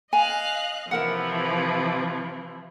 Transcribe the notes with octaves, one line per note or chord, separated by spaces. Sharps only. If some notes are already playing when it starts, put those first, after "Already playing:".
D#5 F5 G#5 F#6
C3 E3 F3 E4 A#4 F#5